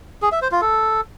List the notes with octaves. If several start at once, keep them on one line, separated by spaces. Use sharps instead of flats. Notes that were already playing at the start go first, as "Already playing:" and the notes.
G#4
E5
C5
F4
A4